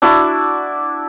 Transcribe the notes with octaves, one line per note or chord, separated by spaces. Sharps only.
D4 E4 F#4 D5